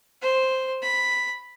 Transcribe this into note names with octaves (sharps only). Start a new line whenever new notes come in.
C5
B5